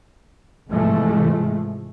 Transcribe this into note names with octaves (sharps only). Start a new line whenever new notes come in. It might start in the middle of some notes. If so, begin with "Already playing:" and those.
G#2 C3 E3 F3 G#3 A3